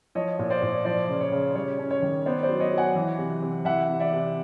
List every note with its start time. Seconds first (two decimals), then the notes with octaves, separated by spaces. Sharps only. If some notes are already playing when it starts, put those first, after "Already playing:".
0.15 F3 C#5 D#5
0.39 A#2
0.50 C5 D5
0.62 A#2
0.85 F3 C5 D5
1.08 C#3
1.21 C#5
1.32 C#3
1.55 G3 C#5
1.79 C#4
1.91 C#5
2.02 D#3
2.26 B3 C5 D5
2.42 C5 D5
2.49 F#3
2.60 C#5 D#5
2.72 F#3
2.78 F#5 G#5
2.95 E3
3.18 C3
3.42 C3
3.65 E3 E5 F#5
3.89 C3
4.00 D5 E5
4.12 C3